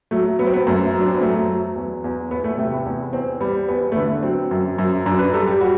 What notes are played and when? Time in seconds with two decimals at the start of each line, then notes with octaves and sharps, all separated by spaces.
0.11 F#3 A3
0.39 F#3 B3
0.46 C4
0.54 B3
0.66 F#2 A3
0.94 F#3
1.00 D4
1.07 C4
1.14 B3
1.21 F#3 A3
1.48 F#3
1.76 E2
2.04 E2
2.31 E2 B3
2.44 A3
2.58 C3 A3
2.72 B3
2.85 E2
3.13 E2 C4
3.40 G3 B3
3.68 E2 B3
3.92 A3
3.96 D3 B3
4.23 F#3 C4
4.51 F#2
4.78 F#2
5.06 F#2 D4
5.19 B4
5.33 G3 A4
5.47 G4
5.60 G3 F#4